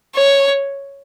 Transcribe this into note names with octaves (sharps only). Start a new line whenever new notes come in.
C#5